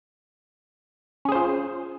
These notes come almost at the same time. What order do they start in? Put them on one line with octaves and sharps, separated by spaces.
C#4 G#4 C5 F4